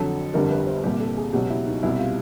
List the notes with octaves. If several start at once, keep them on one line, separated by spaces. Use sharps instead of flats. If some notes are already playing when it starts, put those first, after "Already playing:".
Already playing: F2 D3 F#3 A4
G1 F2 D3 G3 A#4
B4
C5
C2 A#2 G3 G4
A4
G#4
C#2 B2 F#3 G4
E4
D#4
C2 B2 G3 E4
F4